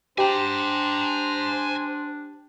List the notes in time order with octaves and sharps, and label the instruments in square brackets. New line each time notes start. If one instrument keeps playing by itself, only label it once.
[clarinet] D4 [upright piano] G4 [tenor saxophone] C5 [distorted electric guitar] G#5 A#5